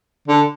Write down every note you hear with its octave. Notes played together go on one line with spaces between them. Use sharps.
D3